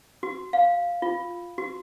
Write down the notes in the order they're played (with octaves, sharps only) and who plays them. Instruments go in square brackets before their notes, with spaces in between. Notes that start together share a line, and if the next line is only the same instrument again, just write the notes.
[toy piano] F#4
F5
F4
F#4